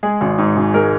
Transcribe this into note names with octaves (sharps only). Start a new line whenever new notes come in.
G#3 G#4
G#1
G#2
G#1
G#3 A#4